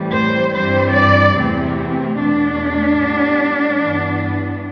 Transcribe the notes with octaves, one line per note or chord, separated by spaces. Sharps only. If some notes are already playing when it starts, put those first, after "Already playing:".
Already playing: A2 E3 G3 C4
C5
G2 E3 G3 C4 C5
D5
E2 C3 E3 A3 C4
E2 B2 A3 D4
A2 G3 B3
G2 E3 B3